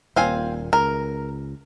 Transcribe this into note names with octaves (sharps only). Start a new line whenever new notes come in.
D#1 A#2 C4 F5 G#5
C#2 A#4